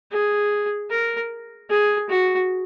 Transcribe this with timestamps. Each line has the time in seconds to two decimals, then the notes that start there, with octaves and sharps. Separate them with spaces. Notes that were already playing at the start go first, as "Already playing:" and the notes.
0.12 G#4
0.90 A#4
1.70 G#4
2.09 F#4